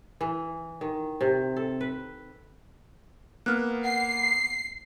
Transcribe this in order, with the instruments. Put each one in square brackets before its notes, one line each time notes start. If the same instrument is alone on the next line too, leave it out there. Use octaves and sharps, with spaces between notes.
[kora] E3
D#3
C3
A4
B4
[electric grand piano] A#3 B3 [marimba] F6 F#6
[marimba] F#5 [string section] C7